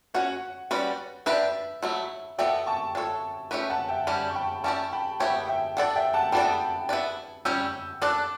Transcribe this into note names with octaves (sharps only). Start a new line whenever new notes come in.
C#4 F#4 C#5 F#5
G3 C#4 F#4 B4 D5
D4 G4 B4 D5 E5
F#3 A3 E4
B3 F#4 A4 D5 E5 G5
A5 C#6
D4 A4 C#5
A3 C#4 G4 B4
F#5 A5
E5 G5
G3 C#4 G4 F#5 A5
C#6
G5 B5
C#4 E4 G4 D5 A5 C#6
G5 B5
B3 E4 G4 C#5 E5 G5
E5 G5
D4 A4 D5 F#5
E5 G5
F#5 A5
E3 B3 D4 A4 D5 G5 B5
B3 E4 B4 D5
G3 C#4 G4 C#5 E6 G6
D4 A4 D5 D6 F#6